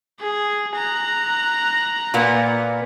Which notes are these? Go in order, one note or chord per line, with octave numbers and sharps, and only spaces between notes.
G#4
A#5 F#6
A#2 A#3 B3